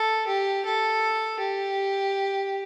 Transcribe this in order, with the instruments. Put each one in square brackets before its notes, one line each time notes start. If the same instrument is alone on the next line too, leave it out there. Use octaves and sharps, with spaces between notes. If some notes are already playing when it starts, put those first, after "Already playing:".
Already playing: [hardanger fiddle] A4
G4
A4
G4